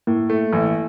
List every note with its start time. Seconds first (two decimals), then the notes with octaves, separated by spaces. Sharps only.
0.07 A2 A#3
0.30 A3
0.53 A1